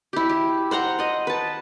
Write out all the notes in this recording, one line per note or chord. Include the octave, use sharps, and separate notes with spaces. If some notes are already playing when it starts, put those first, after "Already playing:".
E4 G4
G4
C5 F#5 A#5 C6
D#5 F#5
B4 A5